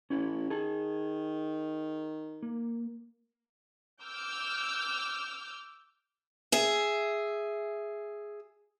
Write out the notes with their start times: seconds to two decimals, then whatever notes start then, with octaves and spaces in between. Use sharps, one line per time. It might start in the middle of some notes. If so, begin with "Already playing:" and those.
0.10 A1 C#4 E4
0.50 D#3 G#4 A5
2.43 A#3
4.01 D6 E6 F6 G6
6.52 G#4 E5